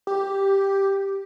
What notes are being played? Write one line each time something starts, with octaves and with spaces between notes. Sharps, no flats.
G4